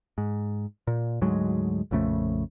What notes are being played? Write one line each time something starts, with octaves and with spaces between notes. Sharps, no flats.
G#2
A#2
D2 G#2 F#3 G#3
A#1 F2 C#3 A3